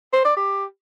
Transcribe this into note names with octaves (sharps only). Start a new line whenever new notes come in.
C5
D5
G4